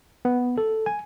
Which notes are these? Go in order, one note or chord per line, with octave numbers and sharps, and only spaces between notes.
B3
A4
G#5